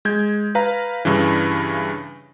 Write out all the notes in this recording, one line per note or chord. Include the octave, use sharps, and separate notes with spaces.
G#3 G6 G#6
B4 F5 A#5
G2 C#3 E3